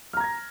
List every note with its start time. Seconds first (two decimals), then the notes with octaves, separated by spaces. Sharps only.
0.13 F6
0.17 A#5
0.20 G#6
0.24 A#6